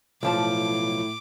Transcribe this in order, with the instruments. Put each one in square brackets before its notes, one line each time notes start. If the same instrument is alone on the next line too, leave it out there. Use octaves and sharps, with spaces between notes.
[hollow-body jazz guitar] B1 F3 A5 [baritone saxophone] A2 [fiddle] D6